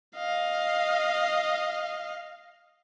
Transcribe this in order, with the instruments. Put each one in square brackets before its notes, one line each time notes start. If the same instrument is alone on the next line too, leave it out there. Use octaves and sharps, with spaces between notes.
[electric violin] D#5 F5